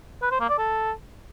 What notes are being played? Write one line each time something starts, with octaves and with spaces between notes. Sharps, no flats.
B4
C5
A#3
D5
A4